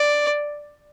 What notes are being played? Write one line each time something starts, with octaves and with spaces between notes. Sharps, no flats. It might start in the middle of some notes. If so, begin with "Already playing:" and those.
Already playing: D5